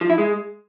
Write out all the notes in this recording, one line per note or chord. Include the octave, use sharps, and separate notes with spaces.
F3
E4
G#3